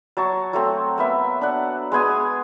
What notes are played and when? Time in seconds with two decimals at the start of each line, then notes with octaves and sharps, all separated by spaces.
0.17 F#3 A5 C#6
0.53 F#3 A3 C4
0.98 A#3 B3 E5
1.41 D4 F#5
1.92 G#3 B3 G#5 D#6